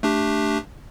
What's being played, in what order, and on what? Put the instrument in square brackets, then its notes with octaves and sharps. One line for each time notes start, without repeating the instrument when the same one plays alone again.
[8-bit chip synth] A3 D4 G4